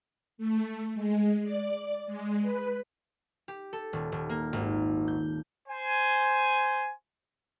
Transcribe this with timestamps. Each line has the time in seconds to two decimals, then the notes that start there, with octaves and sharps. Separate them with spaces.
0.38 A3
0.94 G#3
1.43 D5
2.06 G#3
2.42 B4
3.48 G4
3.73 A4
3.93 D#1
4.12 D#1
4.30 A#3
4.53 G#1
5.08 G6
5.69 C5 G#5